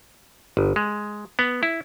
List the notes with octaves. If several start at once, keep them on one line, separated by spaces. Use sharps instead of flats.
G1
G#3
B3
E4